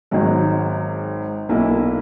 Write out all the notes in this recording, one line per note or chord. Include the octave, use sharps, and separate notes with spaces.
G#1 G#2 F#3
B1 A#2 A#3 E4